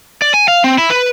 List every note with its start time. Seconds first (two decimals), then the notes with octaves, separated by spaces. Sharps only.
0.22 D5
0.34 G#5
0.48 F5
0.64 C4
0.78 E4
0.90 B4